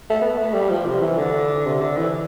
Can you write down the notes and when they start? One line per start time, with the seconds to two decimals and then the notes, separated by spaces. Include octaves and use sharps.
0.10 A3
0.22 B3
0.38 A3
0.54 G3
0.70 F3
0.85 C3
1.01 E3
1.17 D3
1.66 C3
1.81 D3
1.97 E3